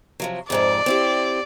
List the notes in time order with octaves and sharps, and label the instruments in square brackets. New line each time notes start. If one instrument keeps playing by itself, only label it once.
[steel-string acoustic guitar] C3 F3 F#3
[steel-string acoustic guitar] F2 G#2 F3 [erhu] D5
[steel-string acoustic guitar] C4 E4 G4